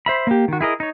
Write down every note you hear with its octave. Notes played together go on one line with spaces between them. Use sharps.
C5 E5 B5
A#3 G4
D#3 F#4
E4 G#4 A#4 D#5
D#4 C#5